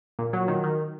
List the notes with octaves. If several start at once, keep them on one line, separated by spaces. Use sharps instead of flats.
A#2
F#3
D#3
D#3